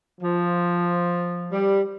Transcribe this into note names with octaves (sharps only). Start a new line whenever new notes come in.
F3
G3